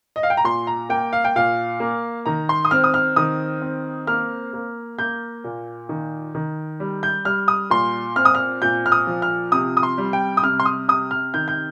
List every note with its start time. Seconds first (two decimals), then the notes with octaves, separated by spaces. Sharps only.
0.16 D#5
0.23 F5
0.30 G5
0.37 A#5
0.44 A#2 C6
0.67 A#5
0.89 A#3 G5
1.13 F5
1.25 G5
1.36 A#2 F5
1.80 A#3
2.26 D#3 A#5
2.49 C6
2.65 D#6
2.71 C4 F6
2.84 D#6
2.94 F6
3.16 D#3 D#6
3.62 C4
4.07 A#3 F6
4.53 A#3
4.98 A#3 G6
5.44 A#2
5.89 D#3
6.35 D#3
6.80 G3
7.03 G6
7.25 G3 F6
7.48 D#6
7.70 A#2 C6
8.16 C4 F6
8.25 D#6
8.35 F6
8.62 A#2 G6
8.86 F6
8.92 D#6
9.07 F3
9.22 F6
9.52 C3 D#6
9.77 D#6
9.83 C6
9.98 G3
10.13 G5
10.37 D#6
10.43 C3 F6
10.60 C6
10.65 D#6
10.88 C3 D#6
11.11 F6
11.34 D#3 G6
11.48 G6